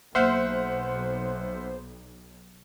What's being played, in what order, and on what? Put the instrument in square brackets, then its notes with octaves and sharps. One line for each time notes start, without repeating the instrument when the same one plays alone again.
[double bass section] B1 [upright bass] A#3 [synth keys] C5 [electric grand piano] E5 F#5 F6